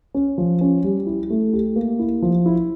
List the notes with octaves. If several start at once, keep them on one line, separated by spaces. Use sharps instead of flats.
C#4
F3
C#4
G3
E4
A3
G4
A#3
E4
F3
E4